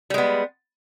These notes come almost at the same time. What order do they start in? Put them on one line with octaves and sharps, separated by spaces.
G3 G#3 B3